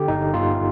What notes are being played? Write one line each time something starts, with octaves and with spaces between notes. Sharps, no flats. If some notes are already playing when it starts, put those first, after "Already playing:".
Already playing: D3 G4
G1 D#4
G1 F4